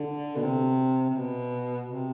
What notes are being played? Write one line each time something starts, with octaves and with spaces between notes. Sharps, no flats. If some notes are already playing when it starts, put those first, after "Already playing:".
Already playing: D3
B2
C3
C3
B2
C3